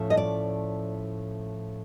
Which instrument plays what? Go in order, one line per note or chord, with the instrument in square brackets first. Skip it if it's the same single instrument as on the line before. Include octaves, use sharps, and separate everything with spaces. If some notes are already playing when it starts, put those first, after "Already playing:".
Already playing: [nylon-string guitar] A2 F3 A3 C#4
D#5
D5